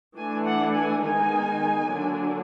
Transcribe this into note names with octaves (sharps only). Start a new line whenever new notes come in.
E3 A3 D4 G#5
F#5
G#5
D#3 G#3 B3 D#4 G#5
D3 F#3 A#3 D4